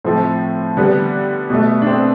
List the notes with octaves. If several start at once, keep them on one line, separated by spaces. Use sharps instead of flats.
A2 F3 A3 C4
D3 G3 B3
B2 A3
D4
C4